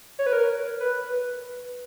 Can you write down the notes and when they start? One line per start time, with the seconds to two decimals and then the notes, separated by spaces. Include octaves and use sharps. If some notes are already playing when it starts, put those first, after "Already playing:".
0.19 C#5
0.26 B4
0.33 A#4
0.80 B4